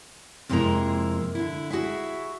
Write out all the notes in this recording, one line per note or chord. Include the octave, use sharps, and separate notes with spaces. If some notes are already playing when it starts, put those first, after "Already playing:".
F2 C3 G#3 A#3 E4 A#5
D3 E4
E4 F#4 G#4 E5